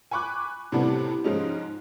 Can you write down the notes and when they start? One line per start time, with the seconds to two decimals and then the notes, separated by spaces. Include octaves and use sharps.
0.11 G#5 B5 C#6 D6 F#6
0.72 A2 C3 E3 G3 B3 D4
1.24 G#2 F3 G#3 C#4 D#4